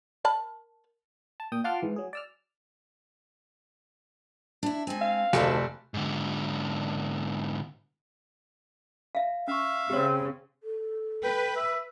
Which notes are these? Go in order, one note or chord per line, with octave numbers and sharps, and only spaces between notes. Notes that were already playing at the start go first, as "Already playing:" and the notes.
A#4 A5 B5
A5
A#2 G5 D#6
F4 F#5 A5 C6 D6 F6
G#2 E3
F#3 G#4
D5 E6 F6
D4 E4
G#3 C4 G#5
F5
F1 D2 D#3 G4 A4 D5
G#2 D3
E5 F5
C#4 E5 F5 C#6
C#3 C4 G4 C#5
A4
B4 G5
E5